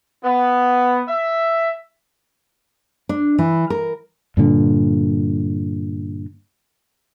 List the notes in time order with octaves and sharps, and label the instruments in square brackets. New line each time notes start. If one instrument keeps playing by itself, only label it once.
[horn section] B3
E5
[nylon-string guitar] D4
E3
A#4
[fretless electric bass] G2 A#2 D3